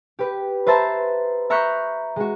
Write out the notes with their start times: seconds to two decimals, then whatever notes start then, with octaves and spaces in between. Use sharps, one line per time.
0.19 G4 B4
0.67 B4 C5 E5 A5 A#5 C6
1.50 E5 A#5 C#6 F#6 G6 B6
2.16 G#3 F#4